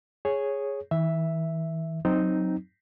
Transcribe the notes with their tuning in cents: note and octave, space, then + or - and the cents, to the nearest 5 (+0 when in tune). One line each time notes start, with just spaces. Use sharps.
G#4 +0 C#5 -5
E3 -45 E5 +0
F#3 +0 C4 +0 D#4 +0